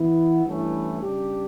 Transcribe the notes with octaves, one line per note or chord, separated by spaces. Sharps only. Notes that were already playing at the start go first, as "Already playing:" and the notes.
Already playing: E3 B3 E4
G2 E3 A3 C#4 E4
C#3 G3 D4 G4